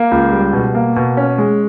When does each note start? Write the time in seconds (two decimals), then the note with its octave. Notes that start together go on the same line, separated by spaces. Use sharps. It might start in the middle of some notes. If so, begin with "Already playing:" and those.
Already playing: A#3
0.11 C#2
0.32 G3
0.53 B2
0.75 A#3
0.96 B2
1.17 C#4
1.38 G#3